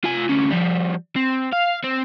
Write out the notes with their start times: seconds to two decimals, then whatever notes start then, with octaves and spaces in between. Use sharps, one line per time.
0.04 F4 G#5
0.29 D2 C#4
0.51 F3 G3
1.16 C4
1.53 F5
1.84 C4